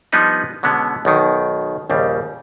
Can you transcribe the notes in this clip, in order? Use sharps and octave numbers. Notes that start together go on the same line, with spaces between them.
F3 G3 B3 D4 D#4 B4
B2 D3 G#3 B3 C#4
B1 B2 D#3
A#1 D#2 C#3 G3